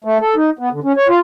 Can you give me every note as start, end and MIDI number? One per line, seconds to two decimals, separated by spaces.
0.04 0.18 57
0.21 0.35 69
0.36 0.50 63
0.59 0.69 59
0.72 0.80 50
0.84 0.92 61
0.97 1.08 73
1.08 1.19 65